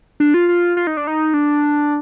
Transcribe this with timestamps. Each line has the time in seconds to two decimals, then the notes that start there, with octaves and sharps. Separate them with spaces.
0.20 D4
0.34 F4
0.49 F4
0.77 F4
0.87 D#4
0.97 D4
1.07 D#4
1.34 D4